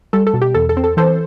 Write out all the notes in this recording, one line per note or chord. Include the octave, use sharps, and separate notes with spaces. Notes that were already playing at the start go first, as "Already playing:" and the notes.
G3 A4
A4
B2
G4
E2 A4
A4
C4
A4
E3 A4 C5